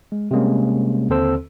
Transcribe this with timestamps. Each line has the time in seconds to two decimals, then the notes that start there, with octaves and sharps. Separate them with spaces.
0.12 G#3
0.31 C3 G3 G#3 A#3 C#4
1.09 D#2 D3 C4 A4 C5 E6